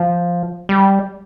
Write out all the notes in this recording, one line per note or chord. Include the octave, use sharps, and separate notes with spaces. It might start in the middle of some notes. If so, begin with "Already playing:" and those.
Already playing: F3
G3